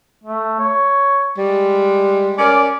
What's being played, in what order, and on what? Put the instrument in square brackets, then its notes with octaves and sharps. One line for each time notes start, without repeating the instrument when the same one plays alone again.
[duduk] A3
C#5
[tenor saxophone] G3 [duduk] G#3
[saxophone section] C#4 A#4 D5